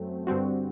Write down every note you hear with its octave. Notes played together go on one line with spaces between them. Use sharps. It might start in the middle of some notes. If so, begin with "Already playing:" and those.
Already playing: F#2 F#3 A3 C4
G2 D3 G3 C4 F#4